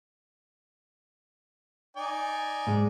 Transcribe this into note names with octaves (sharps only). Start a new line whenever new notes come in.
D#4 D5 G#5
G#2 G#3